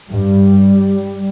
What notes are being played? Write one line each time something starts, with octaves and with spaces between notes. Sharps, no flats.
G2 G3